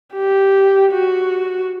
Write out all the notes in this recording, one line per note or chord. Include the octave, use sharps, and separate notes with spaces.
G4
F#4